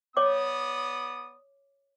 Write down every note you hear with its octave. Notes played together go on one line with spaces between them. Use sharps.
B3 C#5 D5 D6 D#6